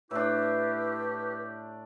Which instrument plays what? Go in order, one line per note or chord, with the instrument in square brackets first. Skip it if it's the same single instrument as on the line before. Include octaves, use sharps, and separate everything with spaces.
[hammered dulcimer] A2 D4 [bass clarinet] E4 [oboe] G4 [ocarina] B4